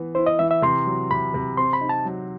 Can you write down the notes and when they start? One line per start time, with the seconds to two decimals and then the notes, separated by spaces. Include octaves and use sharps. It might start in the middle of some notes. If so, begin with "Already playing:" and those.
Already playing: E3 B3
0.15 E4 C5
0.26 D#5
0.39 E3 E5
0.51 E5
0.62 C3 C6
0.86 F#3
1.11 C3 B5
1.34 C3
1.57 C4 C6
1.73 B5
1.81 D#4
1.89 A5
2.05 F#3